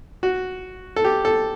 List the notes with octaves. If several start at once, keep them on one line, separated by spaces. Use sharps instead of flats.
F#4
A4
G4
A4